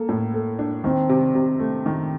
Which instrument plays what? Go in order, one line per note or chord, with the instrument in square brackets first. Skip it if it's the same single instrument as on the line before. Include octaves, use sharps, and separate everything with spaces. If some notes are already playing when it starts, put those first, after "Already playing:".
Already playing: [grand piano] A#3 [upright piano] A4
[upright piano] A2
A4
D4
[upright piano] D#3 [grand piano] C4
[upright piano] C3
C3
A3
D#3